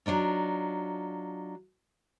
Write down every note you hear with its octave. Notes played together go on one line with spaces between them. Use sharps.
F#3 D4 D#4 F4